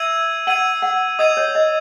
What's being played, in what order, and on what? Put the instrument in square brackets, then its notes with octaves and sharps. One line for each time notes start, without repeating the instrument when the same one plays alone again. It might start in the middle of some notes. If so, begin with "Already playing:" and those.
Already playing: [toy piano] E5 [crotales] E6 G#6 D#7 F#7
[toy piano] F#5 [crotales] E6 G#6 D#7 F#7
[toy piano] F#5
[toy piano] D#5 [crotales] D#6 G#6 D#7
[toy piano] C#5
D#5